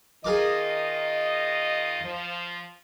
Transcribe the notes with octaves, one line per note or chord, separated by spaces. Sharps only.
D#3 F4 G#4 A#4 D#5 D6
F3